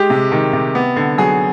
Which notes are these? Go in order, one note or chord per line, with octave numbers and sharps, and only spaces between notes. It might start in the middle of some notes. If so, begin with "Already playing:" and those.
Already playing: G#3 G4
C3
D#3
C3
B3
D3
F#3 G#4